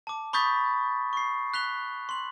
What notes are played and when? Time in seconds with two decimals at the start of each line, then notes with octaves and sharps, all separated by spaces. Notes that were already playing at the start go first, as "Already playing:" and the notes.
0.07 A5 D6
0.33 B5 C#6 D#6 G6 A6 B6
1.13 C#6 C7
1.54 F#6 B6 F7 G7
2.09 C6 F#7